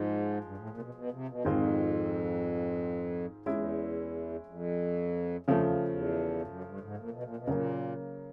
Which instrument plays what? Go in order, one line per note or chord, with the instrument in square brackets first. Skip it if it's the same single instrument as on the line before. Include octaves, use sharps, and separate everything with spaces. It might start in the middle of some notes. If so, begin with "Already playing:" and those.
Already playing: [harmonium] G#2 [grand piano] F3 G#3
[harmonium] G2
A2
A#2
C3
B2
B2
C3
B2
[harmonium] F2 [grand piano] G#2 D#3 G#3 C4 F4
[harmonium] E2 [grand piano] G#3 C#4 E4
[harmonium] F2
[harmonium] F2 [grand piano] C#3 F3 A3
[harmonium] E2
E2
G2
F#2
G2
G#2
A#2
B2
A#2
B2
[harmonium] A#2 [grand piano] C#3 F#3 A#3